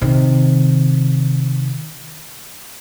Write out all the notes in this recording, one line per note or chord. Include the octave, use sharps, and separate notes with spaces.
C3 D#3